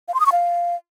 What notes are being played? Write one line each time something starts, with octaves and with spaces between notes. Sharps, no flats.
F5
C6
D#6
C#6
F5